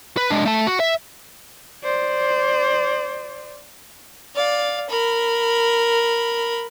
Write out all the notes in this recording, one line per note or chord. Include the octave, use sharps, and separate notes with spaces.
B4
G#3 D4
A3 A5
F#4
E5
C5 D5
D5 F5
A#4 B5